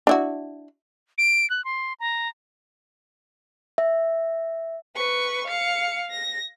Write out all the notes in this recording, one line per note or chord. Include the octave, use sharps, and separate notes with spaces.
D4 E4 F#4
D7
F#6
C6
A#5
E5
B4 C#6
F5 C#7
A#6